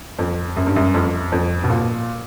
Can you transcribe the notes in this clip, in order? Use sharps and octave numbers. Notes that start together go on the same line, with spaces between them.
F2
F#2
G2
F#2
F2
F2
B2
A#2